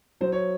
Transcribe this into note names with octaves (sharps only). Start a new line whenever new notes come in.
F#3 C5
C#5